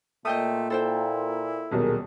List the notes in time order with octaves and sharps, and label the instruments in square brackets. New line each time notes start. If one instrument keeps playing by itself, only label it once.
[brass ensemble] A#2 [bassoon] A3 [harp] D#5 G5 D#6
[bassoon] E4 [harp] A4 C5 G5
[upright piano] D#1 B1 [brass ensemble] G#4 A#4